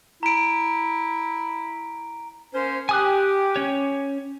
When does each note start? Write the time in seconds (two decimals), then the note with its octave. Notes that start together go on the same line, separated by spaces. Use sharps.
0.23 E4 A#5 D7
2.54 A#3 C#4 C5
2.89 G4 G#5 D#6 F#6
3.56 C#4 C#5